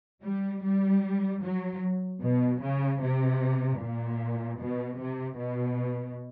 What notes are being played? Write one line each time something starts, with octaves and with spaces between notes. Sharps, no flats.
G3
G3
F#3
B2
C#3
C3
A#2
B2
C3
B2